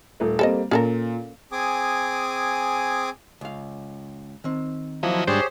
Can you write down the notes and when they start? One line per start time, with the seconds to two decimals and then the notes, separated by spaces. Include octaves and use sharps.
0.20 D#1 A3
0.39 G3 A#3 C4 A4 C#5 D#5
0.71 A#2 C#4 A4 A#4
1.52 C4 G#4 G#5 D6 D#6
3.41 C#2 F5
4.44 D#3 C4
5.03 F3 F#3 A#3 E4 D#5
5.27 G#2 G3 D4 G4 G#4 C5 C#5